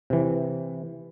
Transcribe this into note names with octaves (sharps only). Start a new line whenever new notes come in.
C3 E3